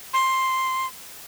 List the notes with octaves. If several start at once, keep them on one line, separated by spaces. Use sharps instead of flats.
C6